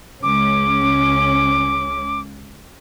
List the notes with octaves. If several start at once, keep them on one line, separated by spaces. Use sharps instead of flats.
C#2 C#4 D6